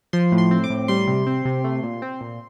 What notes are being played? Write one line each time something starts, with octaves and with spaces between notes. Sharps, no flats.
F3 C6
A2
C6
C4
D6
A2
G3 C6
C3
C4
C3
A3
A#2
C4
A#2